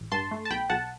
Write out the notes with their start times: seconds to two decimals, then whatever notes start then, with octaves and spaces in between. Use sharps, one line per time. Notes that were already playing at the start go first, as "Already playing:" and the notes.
Already playing: A1
0.12 G2 A5 C6
0.31 A3
0.45 A5
0.51 B1 G5 B5
0.70 B1 F#5 A5